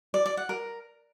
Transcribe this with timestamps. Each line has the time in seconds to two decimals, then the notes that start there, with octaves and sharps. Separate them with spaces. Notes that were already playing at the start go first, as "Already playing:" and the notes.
0.14 D5
0.26 D5
0.37 F#5
0.49 A#4